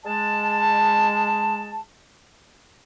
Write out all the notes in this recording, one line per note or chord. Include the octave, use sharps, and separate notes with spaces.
G#3 A5